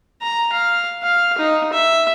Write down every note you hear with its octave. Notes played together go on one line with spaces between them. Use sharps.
A#5
F5
F5
D#4
E5